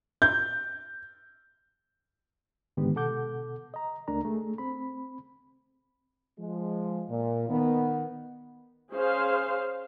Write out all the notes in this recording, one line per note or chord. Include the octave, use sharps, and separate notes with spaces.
G6
G#2 D3 D#3 G#3 B3 G4
B2 A4 F#5 D6 G6
D#5 A#5
C#2 A3 D4 A#4 A#5
A3 G#4
C4 B5
F3 G#3
A#2
D#3 B3
C#4 G#4 C5 F5